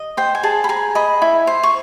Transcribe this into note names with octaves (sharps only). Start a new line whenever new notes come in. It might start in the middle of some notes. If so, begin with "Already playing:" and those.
Already playing: D#5
C5 G5
G#5
G#4 A5
B5
G#4 A#5
D#5 B5
E4
C5
C#6